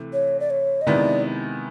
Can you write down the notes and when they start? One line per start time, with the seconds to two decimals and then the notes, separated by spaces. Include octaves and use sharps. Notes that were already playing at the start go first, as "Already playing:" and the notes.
Already playing: C3 E3 A3
0.13 C#5
0.40 D5
0.50 C#5
0.82 D#5
0.87 C3 D#3 G#3 B3 E4 D5